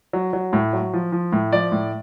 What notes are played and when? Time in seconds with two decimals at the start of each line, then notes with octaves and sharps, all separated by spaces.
0.13 F#3
0.33 F#3
0.53 A2
0.73 F#3
0.93 F3
1.12 F3
1.32 A2
1.53 F3 D5
1.72 A2